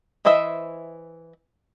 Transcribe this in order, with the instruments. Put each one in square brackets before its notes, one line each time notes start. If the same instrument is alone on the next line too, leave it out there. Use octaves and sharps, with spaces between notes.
[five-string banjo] E3 E4 C5 D#5 E5